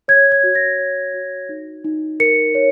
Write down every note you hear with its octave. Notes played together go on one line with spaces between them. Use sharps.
C#5 G#6
G#6
F#4
A#6
C#5
F#4
D#4
D#4
A#4 C#7
C#5